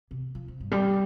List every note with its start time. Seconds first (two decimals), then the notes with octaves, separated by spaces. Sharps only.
0.11 C3
0.35 F3
0.48 C3
0.60 G2
0.71 G3